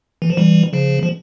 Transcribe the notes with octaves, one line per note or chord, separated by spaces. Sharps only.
E3
F3
E3 G3
C#3 F3
F3